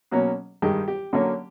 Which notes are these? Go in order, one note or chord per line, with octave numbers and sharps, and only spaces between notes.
B2 F#3 A#3 C#4
G2 D#3 G#3 G4
G4
D3 F#3 A#3 C#4